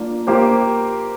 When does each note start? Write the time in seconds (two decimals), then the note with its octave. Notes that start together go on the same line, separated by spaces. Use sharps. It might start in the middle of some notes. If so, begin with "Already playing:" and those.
Already playing: A#3 D4 F4 A#4
0.27 A#3 G4 C5